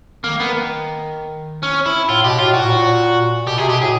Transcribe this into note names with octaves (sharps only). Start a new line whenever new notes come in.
D#3 A#3
B3
C#4
E4
A2 F4
B2 G4
A2 F4
A#2 F#4
A2
A#2
B2 G4
C3 G#4
B2 G4
A2 G#4